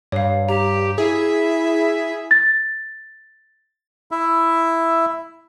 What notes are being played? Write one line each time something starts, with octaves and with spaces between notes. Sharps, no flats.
G2 C#5 F5
G4 A#5
E4 G#4 E5
A6
E4 E5